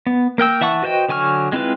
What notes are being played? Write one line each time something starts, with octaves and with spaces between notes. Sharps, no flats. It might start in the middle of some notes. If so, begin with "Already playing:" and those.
B3
A#3 A#4 G5 E6
E3 E5 F#5 A5 C#6
F#4 B4 C5 D#5 G5
D3 F#3 G#5 C#6 F6
G#3 C4 E4 F4 B4